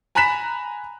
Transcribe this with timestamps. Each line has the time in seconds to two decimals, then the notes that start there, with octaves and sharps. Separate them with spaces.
0.15 G#5 A#5 B5 F#6 B6 E7